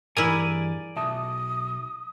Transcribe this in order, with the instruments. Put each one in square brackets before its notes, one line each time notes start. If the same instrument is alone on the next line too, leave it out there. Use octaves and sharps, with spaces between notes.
[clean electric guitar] G2 E3 [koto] E4 G#4 A#4 [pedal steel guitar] D5 G#5
[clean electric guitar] B1 E5 A5 [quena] D#6